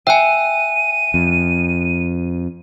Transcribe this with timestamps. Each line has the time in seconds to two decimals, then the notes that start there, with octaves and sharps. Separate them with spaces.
0.07 E5 G5 G#5 F#6 D#7
1.14 F2